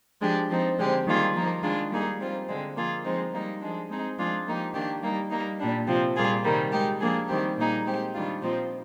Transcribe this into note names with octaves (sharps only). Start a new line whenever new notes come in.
F3 G#3 D4 G4
F3 C4 D#4
D3 G#3 C4 G4
D#3 G3 A#3 F4 G#4
F3 A#3 D#4
D#3 G#3 D4 F4
G3 A#3 D#4 G#4
G3 C4 F4
D3 G#3 C4
F3 A#3 F4 G#4
F3 G#3 C4 D#4
G3 A#3 D#4
F3 G#3 D4
G#3 C4 D#4 G#4
F3 G#3 D4 F4 G#4
F3 A#3 D#4 G4
D#3 A#3 D4 G4
G3 A#3 D#4
G3 A#3 D#4
A#2 G3 D4
C3 F3 C4
A#2 G3 A#3 F4 G#4
C3 D#3 G3 A#3
G#3 D#4 G4
F3 A#3 D4 G#4
D#3 G3 C4 G4
A#2 G3 A#3 D#4 G#4
G#3 C4 G4
D#3 G3 D4 F4
A#2 F3 C4 D#4